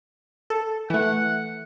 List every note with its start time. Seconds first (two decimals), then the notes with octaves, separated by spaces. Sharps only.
0.50 A4
0.90 E3 A3 F#5